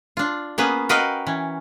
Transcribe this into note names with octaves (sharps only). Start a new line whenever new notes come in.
D4 F4
A#3 B3 C#4 G#4 B4
F#4 A#4 B4 D#5 F5 G5
E3 C#4